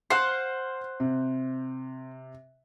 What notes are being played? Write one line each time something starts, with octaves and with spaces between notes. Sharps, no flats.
C5 F5 F#5 F#6 C7
C3